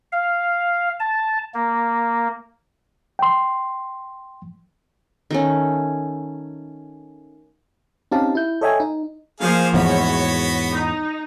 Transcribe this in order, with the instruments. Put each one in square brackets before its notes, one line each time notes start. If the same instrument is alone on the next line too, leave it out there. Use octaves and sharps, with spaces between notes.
[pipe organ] F5
A5
A#3
[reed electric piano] G5 C6
[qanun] D#3 A3 C#4
[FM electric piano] C4 C#4 D#4 G4 F5 A5
E4 G6
A4 C#5 D#5 E5 G5 G#5
D#4
[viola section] F3 A#3 C5 [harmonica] G#4 F5
[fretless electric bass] E2 G#2 [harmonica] B3 F#4 B5 [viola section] C#5
[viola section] D#4